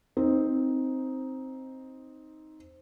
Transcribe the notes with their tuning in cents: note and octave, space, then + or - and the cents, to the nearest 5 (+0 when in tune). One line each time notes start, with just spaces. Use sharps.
C4 +5 D#4 +5